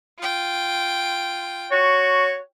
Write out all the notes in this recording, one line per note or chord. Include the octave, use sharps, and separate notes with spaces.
F4 G5
F#4 C#5